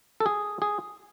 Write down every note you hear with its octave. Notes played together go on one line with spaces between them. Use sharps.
A4
G#4
G#4